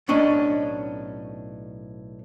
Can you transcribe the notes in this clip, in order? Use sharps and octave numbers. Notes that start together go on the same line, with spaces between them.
B1 A2 C#4 D4 D#5